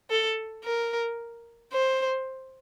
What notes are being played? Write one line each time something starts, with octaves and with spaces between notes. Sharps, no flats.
A4
A#4
C5